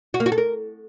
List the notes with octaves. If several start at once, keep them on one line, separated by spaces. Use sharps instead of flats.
F#4
A#3
F#4
A4
A#4